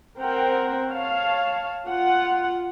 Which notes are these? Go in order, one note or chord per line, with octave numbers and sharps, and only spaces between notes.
C4 A#4 F#5 G5
C#5 F5 A5
F4 F#5